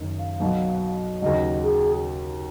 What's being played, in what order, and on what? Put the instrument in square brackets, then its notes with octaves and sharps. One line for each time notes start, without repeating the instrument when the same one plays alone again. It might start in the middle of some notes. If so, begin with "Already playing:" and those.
Already playing: [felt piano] F#1 F#2 D#3
[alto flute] F5
[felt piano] B1 B2 F#3
[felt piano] D#2 C#3 F#3 [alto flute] D#5
[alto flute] G#4